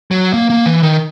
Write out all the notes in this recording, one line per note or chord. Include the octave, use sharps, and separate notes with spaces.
F#3
A#3
A#3
E3
D#3